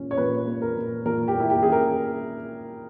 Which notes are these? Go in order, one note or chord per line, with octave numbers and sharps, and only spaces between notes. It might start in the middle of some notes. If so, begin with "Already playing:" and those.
Already playing: A#2 C#4
C#5
A#2 B4
A#3
A#4
A#2
A#2 A#4
G4
A#3 E4
G4
C#4 G#4
A#4